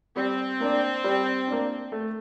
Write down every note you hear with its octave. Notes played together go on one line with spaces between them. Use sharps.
G3 C4
A#3 D4
G3
A#3 D4
A3